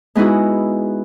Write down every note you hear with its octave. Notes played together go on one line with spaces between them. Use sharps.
G#3 B3 D#4 E4 F#4